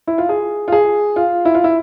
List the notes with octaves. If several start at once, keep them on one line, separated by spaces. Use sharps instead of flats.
E4
F4
G#4
F4
G#4
F4
E4
F4
E4